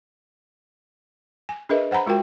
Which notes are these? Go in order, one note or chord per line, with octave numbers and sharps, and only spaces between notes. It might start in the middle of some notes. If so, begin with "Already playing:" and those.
G#5
D4 G#4 A#4 B4 D#5 E5
C5 F#5 G#5 A#5 B5
G#3 F4 F#4 A#4 G5